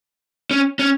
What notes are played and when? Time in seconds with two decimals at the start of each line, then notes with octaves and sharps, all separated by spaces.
0.51 C#4
0.79 C#4